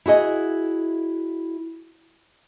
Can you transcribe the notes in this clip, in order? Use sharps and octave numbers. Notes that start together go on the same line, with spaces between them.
E4 F#4 G#4 D#5